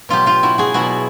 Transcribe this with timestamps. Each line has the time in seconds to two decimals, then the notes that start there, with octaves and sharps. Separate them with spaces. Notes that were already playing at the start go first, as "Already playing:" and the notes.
0.09 B2 F#3 F4 G4
0.26 F4 G4
0.43 E4 F#4
0.58 F#4 G#4
0.74 B2 F#3 E4 F#4